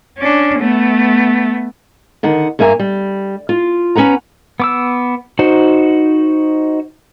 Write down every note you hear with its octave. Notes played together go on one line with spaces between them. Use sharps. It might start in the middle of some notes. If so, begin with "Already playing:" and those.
C#4 D4
A3 B3
D3 D#3 F#5
G2 A#3 E5 G#5 A#5
G3
F4
C#4 B4 F#5 A#5
B3 D6 E6
D#4 F#4 C5